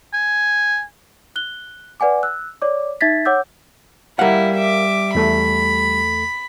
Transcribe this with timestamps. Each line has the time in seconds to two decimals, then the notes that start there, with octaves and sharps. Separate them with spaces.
0.14 G#5
1.36 F#6 G7
2.00 B4 D5 F#5 G#5 D6
2.23 E6 F#6
2.62 C#5 D5 D6
3.01 D#4 E5 G#6 A6 B6
3.25 C#5 F#5 D6 E6 G6
4.19 G3 E4 A#4 F5 F#5
4.56 E5 D6
5.15 E2 A3 A4 B5